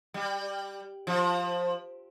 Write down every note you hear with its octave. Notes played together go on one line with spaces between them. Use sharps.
G3
F3